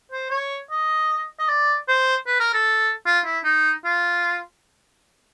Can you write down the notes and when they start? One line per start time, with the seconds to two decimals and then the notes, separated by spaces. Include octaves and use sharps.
0.12 C5
0.30 C#5
0.70 D#5
1.39 D#5
1.49 D5
1.88 C5
2.27 B4
2.40 A#4
2.54 A4
3.06 F4
3.25 E4
3.44 D#4
3.84 F4